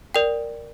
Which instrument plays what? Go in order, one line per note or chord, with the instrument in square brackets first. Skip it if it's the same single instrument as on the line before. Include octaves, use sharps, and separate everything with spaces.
[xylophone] A#4 D5 G5